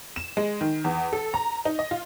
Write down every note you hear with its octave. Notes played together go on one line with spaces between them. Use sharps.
E7
G#3
D#3
E2
A4
A#5
D#4
D#5
F4